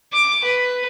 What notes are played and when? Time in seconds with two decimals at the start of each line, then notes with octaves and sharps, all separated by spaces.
0.13 D6
0.44 B4